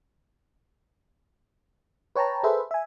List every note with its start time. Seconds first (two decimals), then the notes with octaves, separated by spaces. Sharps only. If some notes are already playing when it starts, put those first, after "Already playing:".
2.16 B4 C#5 G5 A5 A#5
2.43 G#4 A4 B4 C5 E5
2.71 E5 G#5